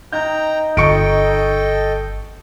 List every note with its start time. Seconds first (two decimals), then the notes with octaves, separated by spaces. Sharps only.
0.13 D#4 G5 A#5 G6
0.77 G1 A4 D#5 G5 C#6 C#7 D7